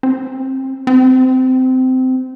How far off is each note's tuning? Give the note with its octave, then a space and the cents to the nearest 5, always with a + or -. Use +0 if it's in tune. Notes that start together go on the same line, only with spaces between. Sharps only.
C4 +25
C4 -20